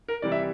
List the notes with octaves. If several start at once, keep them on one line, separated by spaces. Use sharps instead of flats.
A#4
C3 E3 G3 D5
E5